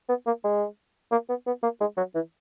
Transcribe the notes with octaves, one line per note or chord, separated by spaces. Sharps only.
B3
A#3
G#3
A#3
B3
B3
A#3
G#3
F#3
E3